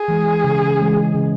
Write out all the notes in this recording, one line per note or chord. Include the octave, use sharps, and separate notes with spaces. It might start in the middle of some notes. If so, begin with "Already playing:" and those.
Already playing: G#4
E3 G#3
C#3
E3 G#3
C#3